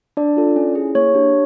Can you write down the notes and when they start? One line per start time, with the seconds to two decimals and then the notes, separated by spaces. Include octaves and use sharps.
0.17 D4 D5
0.37 F4 A4
0.56 C#4
0.75 E4 G#4
0.95 A#3 C#5
1.15 D4 G4